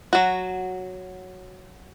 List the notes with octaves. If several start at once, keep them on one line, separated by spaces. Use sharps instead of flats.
F#3 F#4